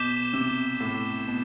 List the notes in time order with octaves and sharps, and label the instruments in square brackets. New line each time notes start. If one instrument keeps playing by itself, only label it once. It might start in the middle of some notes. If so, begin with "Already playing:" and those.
Already playing: [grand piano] B2 [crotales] D6 G6 B6 E7 G7
[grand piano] C3
A2
B2